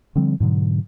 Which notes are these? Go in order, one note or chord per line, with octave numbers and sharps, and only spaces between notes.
D3 F3 G3 C4
G#2 B2 D3 F#3